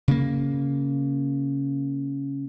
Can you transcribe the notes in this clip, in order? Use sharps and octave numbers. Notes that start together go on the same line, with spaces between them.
C#3 A#3